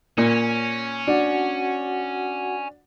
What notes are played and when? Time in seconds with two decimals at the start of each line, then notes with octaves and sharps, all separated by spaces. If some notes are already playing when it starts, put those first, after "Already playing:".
0.18 A#2 C#4
1.07 D4 F#4 F#5